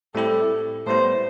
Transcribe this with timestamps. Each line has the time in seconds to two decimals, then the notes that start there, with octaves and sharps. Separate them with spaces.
0.14 A2 G3 C4 E4 G4 A4
0.86 A2 G3 B3 E4 C5